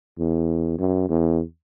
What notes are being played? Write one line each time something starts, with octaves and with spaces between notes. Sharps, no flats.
E2
F#2
E2